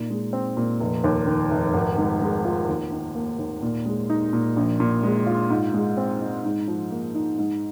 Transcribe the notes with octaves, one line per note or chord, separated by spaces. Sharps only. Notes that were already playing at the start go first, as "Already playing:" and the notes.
Already playing: A#2 D#4
G#3
C4
A#2
F1
D#2
D#3
F1
G#1
G#2
G#3
F4
D#2
D#3
A#3
D#2
A#2
G#3
D#4
A#2
A#1
A#2
G#3
F4
G#2
G#3
C4
D#4
G#2
F3
A#3
D#4
G#2